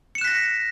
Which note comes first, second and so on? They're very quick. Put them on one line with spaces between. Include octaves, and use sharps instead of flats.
C#7 E7 F#6 B6 A#6